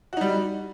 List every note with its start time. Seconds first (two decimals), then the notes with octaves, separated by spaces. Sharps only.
0.13 F#4
0.17 D#4
0.21 G3